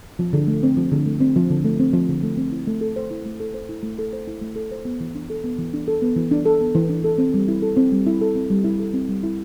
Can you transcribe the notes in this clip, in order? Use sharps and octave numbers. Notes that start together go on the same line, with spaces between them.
F3
D3
A3
C4
F3
D3
A3
C4
F3
D3
A3
C4
F3
D3
A3
C4
E4
A3
A4
C5
E4
A3
A4
C5
E4
A3
A4
C5
E4
A3
A4
C5
B3
E3
D4
A4
B3
E3
D4
A4
B3
E3
D4
A4
B3
E3
D4
A4
C4
G3
E4
A4
C4
G3
E4
A4
C4
G3
E4
A4
C4
G3
E4